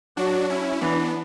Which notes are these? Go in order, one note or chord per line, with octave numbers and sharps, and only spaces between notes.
F#3 D4 F#4
C#4 E4
E3 B3 D4